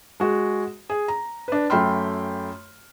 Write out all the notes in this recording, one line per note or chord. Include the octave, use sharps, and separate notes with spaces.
G#3 F#4
G#4
A#5
D4 B4
F#2 A3 G5 B5 C6 F6